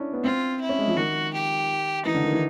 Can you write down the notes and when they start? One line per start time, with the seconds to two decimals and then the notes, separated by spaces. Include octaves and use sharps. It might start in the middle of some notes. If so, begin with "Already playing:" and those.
Already playing: C#4 D4 E4
0.13 B3
0.24 C4 F4
0.61 E4
0.69 C#4
0.79 G#3
0.88 F3
0.96 D#3 F#4
1.33 G4
2.05 E3 D#4
2.14 D3
2.24 D#3
2.33 E3